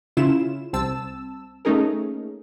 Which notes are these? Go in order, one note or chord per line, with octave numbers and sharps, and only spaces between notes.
C#3 C#4 E4 F4 E7
C2 C4 A5 E6
A3 A#3 C#4 D#4 G#4 A#4